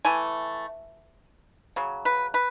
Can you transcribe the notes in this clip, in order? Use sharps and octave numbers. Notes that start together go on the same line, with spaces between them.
E3 A3 G#5
C#3 F#3
B4
B4